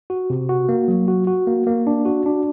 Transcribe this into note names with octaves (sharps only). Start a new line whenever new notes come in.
F#4
C3
F#4
A#3
F#3
F#4
F#4
A#3
A#3
D4
F#4
D4